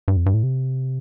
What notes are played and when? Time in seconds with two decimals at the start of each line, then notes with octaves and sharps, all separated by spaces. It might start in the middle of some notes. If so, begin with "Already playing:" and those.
0.08 G2
0.17 F2
0.26 G2
0.34 A2
0.43 C3